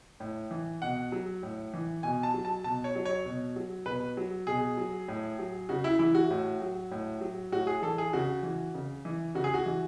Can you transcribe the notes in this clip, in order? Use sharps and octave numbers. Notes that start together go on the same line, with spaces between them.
A2
E3
B2 F#5
F#3
A2
E3
B2 G#5
A5
F#3
A5
B2 A5
C#5
F#3
C#5
B2
F#3
B2 B4
F#3
B2 G#4
F#3
A2
F#3
C#3 F#4
E4
E3 E4
F#4
A2
F#3
A2
F#3
A2 F#4
G#4
E3 A4
G#4
C#3 F#4
E3
C#3
E3
C#3 F#4
G#4
F#4
E3